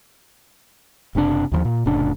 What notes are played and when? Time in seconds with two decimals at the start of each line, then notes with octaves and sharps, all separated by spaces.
1.15 F#1 C3 C4 D4
1.52 D#2 D#3 F3
1.65 A#2
1.86 F1 A2 C#3 D4